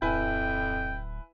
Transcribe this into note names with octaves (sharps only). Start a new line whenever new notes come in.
D1 F2 E4 B4 G5 G#5